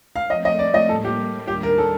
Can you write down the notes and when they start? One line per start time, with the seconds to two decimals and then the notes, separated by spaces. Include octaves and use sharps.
0.16 F5
0.30 F3 A3 C4 D#5
0.45 D#5
0.59 D5
0.74 D#5
0.89 A2 G3 A#3 A4
1.04 G4
1.47 D#2 D#3 G3 D4 G4
1.63 A#4
1.78 A4